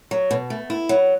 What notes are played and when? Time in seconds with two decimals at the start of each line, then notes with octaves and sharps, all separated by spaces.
0.11 F#3
0.31 B2
0.50 A3
0.70 E4
0.89 F#3